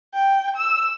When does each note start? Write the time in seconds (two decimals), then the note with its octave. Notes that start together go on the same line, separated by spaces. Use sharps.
0.14 G5
0.56 E6